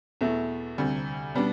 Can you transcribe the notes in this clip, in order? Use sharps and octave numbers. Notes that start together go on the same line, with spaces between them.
E2 B2 A3 E4
D2 C3 G3
B2 G3 B3 D4